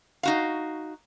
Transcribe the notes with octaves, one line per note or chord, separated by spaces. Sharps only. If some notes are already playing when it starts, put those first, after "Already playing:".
D#4 F#4 F5